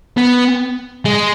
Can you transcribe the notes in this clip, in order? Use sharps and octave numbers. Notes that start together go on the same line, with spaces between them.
B3
G#3